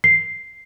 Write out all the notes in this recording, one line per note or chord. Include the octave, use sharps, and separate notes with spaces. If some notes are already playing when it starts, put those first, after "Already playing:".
C7